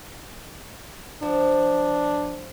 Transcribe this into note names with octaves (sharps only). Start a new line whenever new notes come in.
F3 D4